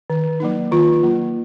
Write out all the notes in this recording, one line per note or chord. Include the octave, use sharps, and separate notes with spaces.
D#3
F#3 A#3 D#4
D#3 F4
F#3 A#3